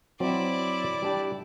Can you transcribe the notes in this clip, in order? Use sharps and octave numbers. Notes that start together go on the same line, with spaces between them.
F#3 C4 E4 D5
G3 D4 G4